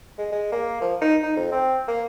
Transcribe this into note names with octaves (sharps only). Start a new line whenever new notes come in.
G#3
G#3
A#3
F3
D#4
D#4
F2
C4
A#3